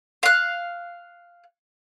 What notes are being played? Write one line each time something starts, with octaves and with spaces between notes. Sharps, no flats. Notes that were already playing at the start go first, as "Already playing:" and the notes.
F5 F#6